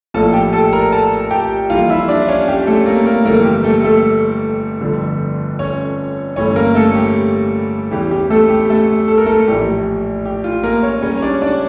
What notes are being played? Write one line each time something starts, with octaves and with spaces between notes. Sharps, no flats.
A#1 A2 F3 A#3 A4 A5
G4 G5
A4 A5
A#4 A#5
A4 A5
G4 G5
F2 E3 G3 A#3 F4 F5
E4 E5
D4 D5
C#4 C#5
G4
A3 A4
A#3 A#4
A#3 A#4
G1 F2 E3 A3 A#3 A#4
G4
A3 A4
A3 A4
G1 F2 D3
C#4 C#5
G1 G2 E3 A3 C#4 C#5
A#3 A#4
A3 A4
G4
E2 C#3 E3 G4
G4
A3 A4
G4
A3 A4
A4
A#4
A3 A4
A#1 A2 E3 G4
G4
F4
A#3 A#4
C#4 C#5
C#2 C#3 G3 C#4 C#5
C#5
D4 D5
D4 D5